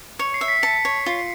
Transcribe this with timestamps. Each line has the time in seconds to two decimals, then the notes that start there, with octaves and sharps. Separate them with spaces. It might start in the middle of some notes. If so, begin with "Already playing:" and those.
0.19 C#5 C#7
0.34 C7
0.41 E5
0.48 B6
0.63 A5 C#7
0.85 C#5
1.06 F4